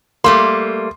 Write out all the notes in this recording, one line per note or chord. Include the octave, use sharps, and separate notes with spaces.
G3 A3 A#3 C6